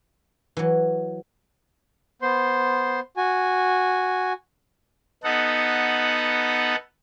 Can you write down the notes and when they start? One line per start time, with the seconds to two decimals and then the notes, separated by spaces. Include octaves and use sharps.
0.57 E3 F#3
2.22 B3 C5 C6
3.17 F#4 G#5
5.24 B3 D#4 A4 F#5